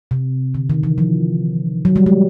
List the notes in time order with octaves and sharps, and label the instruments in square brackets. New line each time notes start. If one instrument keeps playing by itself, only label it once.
[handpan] C3
D3
D#3
E3
F3
F#3
G3
G#3